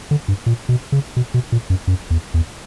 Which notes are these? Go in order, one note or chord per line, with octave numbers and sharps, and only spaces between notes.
D3
G2
A#2
B2
C#3
B2
B2
A#2
F#2
F#2
E2
E2